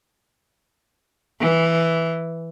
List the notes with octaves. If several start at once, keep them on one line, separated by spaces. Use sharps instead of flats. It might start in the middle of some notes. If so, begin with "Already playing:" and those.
E3